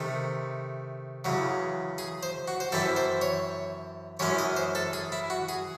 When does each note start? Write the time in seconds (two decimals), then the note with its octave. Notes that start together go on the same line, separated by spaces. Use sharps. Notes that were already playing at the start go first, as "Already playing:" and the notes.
Already playing: C3 D#3 A3 D#4
1.25 E2 C#3 F#3
1.98 G#4
2.23 C5
2.48 F#4
2.60 C5
2.72 F#2 E3 C4 E4 A4
2.96 C5
3.21 C#5
4.19 F#2 E3 G#3 C#4 C#5
4.39 D#5
4.57 C5
4.75 A4
4.93 G#4
5.12 E4
5.30 F#4
5.49 G#4